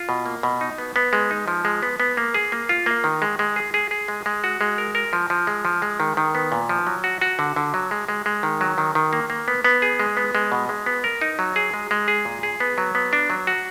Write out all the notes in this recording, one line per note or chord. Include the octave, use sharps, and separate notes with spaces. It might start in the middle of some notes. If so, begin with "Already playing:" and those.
Already playing: F4
B2
A#3
B2
D#4
B3
B3
G#3
D#4
F3
G#3
B3
B3
A#3
G#4
A#3
F4
A#3
D#3
G#3
G#3
G#4
G#4
G#4
G#3
G#3
F#4
G#3
A#4
A#4
F3
F3
G#3
F3
G#3
D#3
D#3
B3
A#2
F3
F#3
F#4
F#4
D3
D3
F#3
G#3
G#3
G#3
D#3
F#3
D#3
D#3
A#3
A#3
B3
B3
G#4
G#3
B3
G#3
B2
G#3
B3
A#4
D#4
F#3
G#4
G#3
G#3
G#4
A#2
G#4
B3
F#3
B3
D4
F#3
F#4